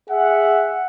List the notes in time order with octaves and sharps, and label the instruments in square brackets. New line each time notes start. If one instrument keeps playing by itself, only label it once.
[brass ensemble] G#4 E5 F#5